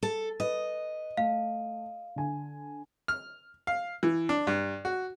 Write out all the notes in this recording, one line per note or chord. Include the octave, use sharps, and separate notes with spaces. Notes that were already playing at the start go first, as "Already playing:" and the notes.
A4
B4 D#5
A3 F5
D3 G#5
F6
F5
E3
D4
G2
F#4